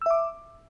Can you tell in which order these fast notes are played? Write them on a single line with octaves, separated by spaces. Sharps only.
E6 E5 D6